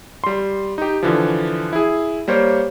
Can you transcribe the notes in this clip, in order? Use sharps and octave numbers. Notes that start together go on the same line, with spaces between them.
G3 C6
D#4 G4
D3 E3 F3
E4 G#4
G3 A#3 C5 C#5